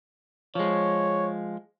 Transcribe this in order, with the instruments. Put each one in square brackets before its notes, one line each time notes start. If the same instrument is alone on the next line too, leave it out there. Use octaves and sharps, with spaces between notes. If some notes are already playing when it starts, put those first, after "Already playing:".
[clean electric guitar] F3 G#3 [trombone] C#5